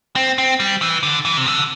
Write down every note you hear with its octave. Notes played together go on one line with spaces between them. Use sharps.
C4
C4
G3
E3
D3
E3
C3
D3